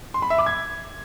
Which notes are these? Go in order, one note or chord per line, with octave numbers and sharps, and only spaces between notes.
C6
B5
E5
D6
G#6